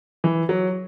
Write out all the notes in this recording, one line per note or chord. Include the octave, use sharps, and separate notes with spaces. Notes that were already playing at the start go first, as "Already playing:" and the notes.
E3
F#3